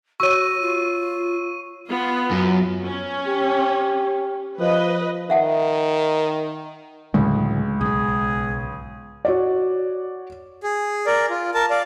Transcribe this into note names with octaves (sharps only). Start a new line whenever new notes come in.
F#4 C#5 C#6 E6 D#7
F4
B3 F4
F#2
C#4
G4
F3 B4 D#5
D#3 E5 F#5 A5
C#2 A2 D3 F#3 G#3
B1 G#2 G#4
F#4 C#5 D5
G#4
A#4 D5
F4
A#4 A5
D5 F5